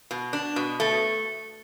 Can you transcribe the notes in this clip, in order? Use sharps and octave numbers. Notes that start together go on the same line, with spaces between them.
B2
D4
B2
A3